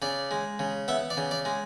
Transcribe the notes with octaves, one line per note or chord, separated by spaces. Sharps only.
C#3 D5
G#3
C#3
B3 E5
D5
C#3
D5
G#3